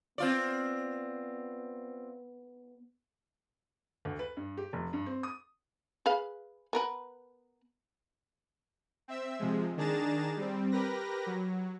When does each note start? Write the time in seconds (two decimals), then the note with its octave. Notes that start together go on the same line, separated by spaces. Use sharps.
0.18 B3 C4 F4 D5
4.05 D2
4.19 B4
4.37 G2
4.57 G4
4.73 F1
4.93 G2
5.06 C4
5.23 D#6
6.06 G#4 B4 F5
6.73 B3 A#4 B4
9.08 C4 E5 E6
9.39 C3 F3 G#3
9.77 D#3 D4 G#4 A#5 A6 E7
10.37 G3 C4
10.71 G4 A#4 B4 A#6
11.26 F#3